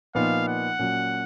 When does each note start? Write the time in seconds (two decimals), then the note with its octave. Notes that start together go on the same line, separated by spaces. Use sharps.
0.15 A#2 F3 B3 D#4 F5
0.48 F#5
0.79 A#2 F#3 C#4